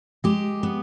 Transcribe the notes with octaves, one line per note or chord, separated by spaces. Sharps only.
G#3 G4
B3